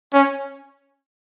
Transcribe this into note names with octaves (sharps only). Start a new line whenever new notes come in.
C#4